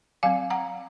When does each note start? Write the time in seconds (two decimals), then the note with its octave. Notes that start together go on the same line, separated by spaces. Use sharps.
0.23 F#3 C4 F5 G#5
0.50 F#5 A#5